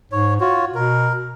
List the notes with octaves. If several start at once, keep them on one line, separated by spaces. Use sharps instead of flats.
G#2 C#5
F4 F#4 C#5
B2 A#4